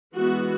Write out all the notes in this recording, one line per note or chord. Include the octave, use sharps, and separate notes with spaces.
E3 G#3 B3 F#4